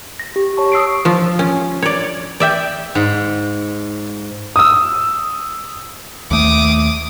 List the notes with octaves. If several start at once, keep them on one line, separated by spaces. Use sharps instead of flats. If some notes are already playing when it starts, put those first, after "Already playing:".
A#6
G4
C#5 A5 C#6
D#6 E6 C7 D7
F3 F4
C#4
C#5 D5
D5 E5 G5
G#2
D#6 E6
D#2 A3 D6 D#6